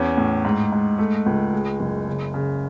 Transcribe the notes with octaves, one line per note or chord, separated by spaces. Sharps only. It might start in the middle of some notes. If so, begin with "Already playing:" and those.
Already playing: E2 C#4
A2
G#2
G#2
A3
C#2
G#3
F#1
C#3
C#3